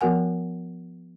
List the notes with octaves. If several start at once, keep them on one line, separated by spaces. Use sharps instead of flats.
F3 B3 F#4 A#4 F#5 G#5